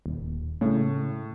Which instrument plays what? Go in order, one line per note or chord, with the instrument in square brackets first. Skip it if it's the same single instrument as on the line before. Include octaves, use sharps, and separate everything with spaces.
[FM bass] D#1
[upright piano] A2 [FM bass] C#3